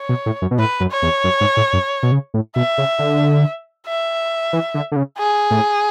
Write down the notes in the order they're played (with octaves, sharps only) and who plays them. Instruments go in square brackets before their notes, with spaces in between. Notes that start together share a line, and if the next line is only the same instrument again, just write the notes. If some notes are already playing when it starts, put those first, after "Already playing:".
Already playing: [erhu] C#5
[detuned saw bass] B2
A2
F#2
B2
[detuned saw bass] A2 [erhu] B4
[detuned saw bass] F#2
[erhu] C#5
[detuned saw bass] E2
F#2
G#2
A2
F#2
B2
C#3
A2
[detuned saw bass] B2 [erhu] E5
[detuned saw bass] C#3
D3
[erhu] E5
[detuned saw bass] E3
D3
D3
C#3
[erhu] G#4
[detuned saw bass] A2